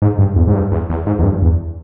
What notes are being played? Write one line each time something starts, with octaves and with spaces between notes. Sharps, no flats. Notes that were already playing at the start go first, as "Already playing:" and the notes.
G#2
G2
E2
G#2
G2
E2
E2
G#2
E2
G2
E2